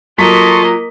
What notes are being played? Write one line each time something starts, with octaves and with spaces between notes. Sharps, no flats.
F#3 A#3 F4 A4 D#5 C6 C#6 B6